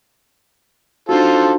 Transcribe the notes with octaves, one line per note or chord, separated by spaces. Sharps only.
D4 D#4 F4 F#4 A4 C5